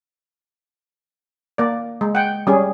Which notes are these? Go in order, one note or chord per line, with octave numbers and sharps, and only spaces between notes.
A#3 D5
G#3
F#5 G5
G3 C#4 G#4